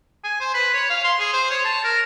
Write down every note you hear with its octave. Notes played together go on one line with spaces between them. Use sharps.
G#5
C5
B4
C#5
F5
C6
G#4
C5
C#5
A5
A#4